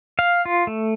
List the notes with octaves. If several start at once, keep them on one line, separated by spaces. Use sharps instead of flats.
F5
F4
A3